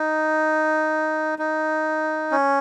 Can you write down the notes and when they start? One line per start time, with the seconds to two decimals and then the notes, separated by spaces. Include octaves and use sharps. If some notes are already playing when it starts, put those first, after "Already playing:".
Already playing: D#4
1.39 D#4
2.32 C#4